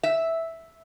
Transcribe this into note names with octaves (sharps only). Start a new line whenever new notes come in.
E5